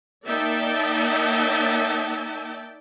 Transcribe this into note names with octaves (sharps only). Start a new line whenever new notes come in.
A#3 D#4 D5 E5 G5 A5